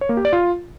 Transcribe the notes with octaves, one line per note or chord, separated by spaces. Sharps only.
C#5
A#3
G4
D5
F4